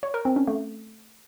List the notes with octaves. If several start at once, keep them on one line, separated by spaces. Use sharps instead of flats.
C#5
A#4
C4
C#4
A3